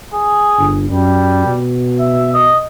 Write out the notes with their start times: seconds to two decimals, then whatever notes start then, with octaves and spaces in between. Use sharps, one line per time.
0.13 G#4
0.58 G1
0.90 F#2 G3
1.46 B2
1.99 E5
2.33 D#5